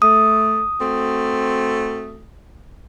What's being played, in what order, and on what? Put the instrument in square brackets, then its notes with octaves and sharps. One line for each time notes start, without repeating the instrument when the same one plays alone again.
[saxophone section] A3 [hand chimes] D#6
[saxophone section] A3 C4 F#4